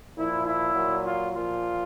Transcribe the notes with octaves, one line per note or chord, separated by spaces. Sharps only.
A#2 F3 E4
E4
A#2 F#3
F4
A#2 F3 F4